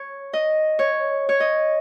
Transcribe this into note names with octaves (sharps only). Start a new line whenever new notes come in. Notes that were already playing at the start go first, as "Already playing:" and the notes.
Already playing: C#5
D#5
C#5
C#5
D#5